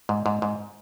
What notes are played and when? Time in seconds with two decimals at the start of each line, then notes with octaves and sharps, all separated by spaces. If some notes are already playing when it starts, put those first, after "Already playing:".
0.09 G#2
0.26 G#2
0.42 G#2